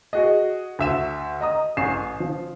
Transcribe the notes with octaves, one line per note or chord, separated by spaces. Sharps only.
F#4 G#4 D#5
D2 E5 E7
D#5 A#5 D#6
A1 G#5 C#6 C7 E7
F3